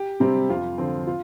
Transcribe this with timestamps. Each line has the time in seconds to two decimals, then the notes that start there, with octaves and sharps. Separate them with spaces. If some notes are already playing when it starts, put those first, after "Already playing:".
Already playing: G4
0.20 C3 G3 C4
0.49 F2 F4
0.78 D3 F3 C4
1.07 F4